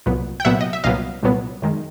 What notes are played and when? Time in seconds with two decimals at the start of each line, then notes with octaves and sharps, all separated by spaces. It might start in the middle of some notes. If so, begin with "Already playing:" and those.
0.06 C2 A#2 F#3 B3
0.40 G5
0.45 C2 A#2 F#3 B3 E5 F#5
0.61 D#5
0.73 E5
0.84 C2 A#2 F#3 B3 D#5 F5
1.23 C2 A#2 F#3 B3
1.62 F#2 D#3 G#3